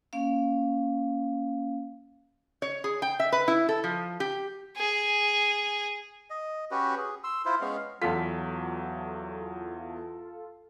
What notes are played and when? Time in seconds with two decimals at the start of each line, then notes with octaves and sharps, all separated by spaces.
0.13 A#3 C#4 F5
2.62 C#5
2.84 G#4
3.02 G5
3.20 E5
3.32 B4
3.48 E4
3.69 A4
3.84 F3
4.20 G4
4.77 G#4
6.30 D#5
6.71 C#4 F#4 G4 B4
6.98 G#4
7.24 C6 E6
7.45 E4 F4 C5
7.61 G#3 B3 C#4 F5
8.02 E2 F#3 F4 A4 B6